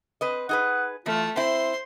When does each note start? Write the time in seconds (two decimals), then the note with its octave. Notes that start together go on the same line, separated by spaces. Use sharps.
0.21 C4 B4 D#5
0.49 D#4 G#4 B4 F#5
1.06 E3 A3 F4
1.37 C4 E4 C5 E5 C6